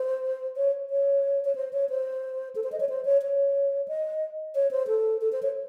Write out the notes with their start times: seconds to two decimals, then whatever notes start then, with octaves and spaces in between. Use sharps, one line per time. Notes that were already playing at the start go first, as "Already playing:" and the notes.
Already playing: C5
0.57 C#5
0.90 C#5
1.45 C#5
1.55 C5
1.73 C#5
1.89 C5
2.55 A4
2.64 C5
2.72 D#5
2.80 C#5
2.89 C5
3.05 C#5
3.22 C#5
3.88 D#5
4.55 C#5
4.71 C5
4.87 A4
5.21 A4
5.32 C5
5.43 C#5